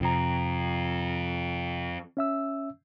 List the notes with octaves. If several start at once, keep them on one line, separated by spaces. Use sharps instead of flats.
F2 C3 A#5
C#4 E5 E6